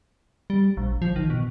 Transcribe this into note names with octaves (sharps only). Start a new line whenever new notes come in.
G3
A#1
F3
D#3
B2